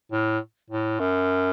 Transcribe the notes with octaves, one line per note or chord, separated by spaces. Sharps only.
A2
A2
F#2